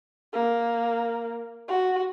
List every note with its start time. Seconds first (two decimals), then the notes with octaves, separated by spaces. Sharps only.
0.33 A#3
1.68 F#4